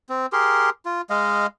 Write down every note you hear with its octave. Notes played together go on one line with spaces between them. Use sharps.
C4
G4 G#4 A#4 C6
F4
G#3 D#5 F5